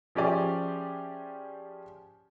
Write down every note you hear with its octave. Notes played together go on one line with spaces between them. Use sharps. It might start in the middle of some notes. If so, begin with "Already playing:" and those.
F3 C#4 G4 G#4 D5 E5